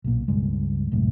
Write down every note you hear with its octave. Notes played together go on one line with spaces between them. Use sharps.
B1 A#2
C#2 G2 G#3
C2 F#2 A2